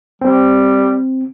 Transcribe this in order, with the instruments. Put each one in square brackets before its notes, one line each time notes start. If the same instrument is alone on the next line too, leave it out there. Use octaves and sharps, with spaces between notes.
[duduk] G3 [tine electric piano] C4